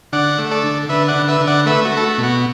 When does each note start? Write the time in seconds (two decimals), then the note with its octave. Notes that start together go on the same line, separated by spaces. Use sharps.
0.13 D3 D5 F#5
0.38 A3
0.51 A4 D5
0.64 D3
0.89 D3 B4 E5
1.08 D5 F#5
1.16 D3
1.28 B4 E5
1.41 D3
1.47 D5 F#5
1.66 A3 B4 E5
1.85 F#4
1.91 A3
1.97 A4
2.04 F#4
2.18 B2
2.23 F#4